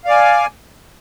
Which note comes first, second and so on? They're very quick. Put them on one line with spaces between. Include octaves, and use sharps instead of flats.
F5 D5 G#5